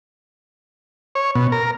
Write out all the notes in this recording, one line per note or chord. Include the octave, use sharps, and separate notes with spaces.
C#5
B2
A#4